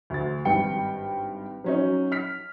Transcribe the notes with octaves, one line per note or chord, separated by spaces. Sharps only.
D2 A6
G#1 G2 G5 C#7
F#3 C#4 D#4
F6 B6